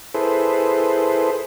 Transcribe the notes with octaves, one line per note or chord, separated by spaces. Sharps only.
E4 G#4 A4 B4 C5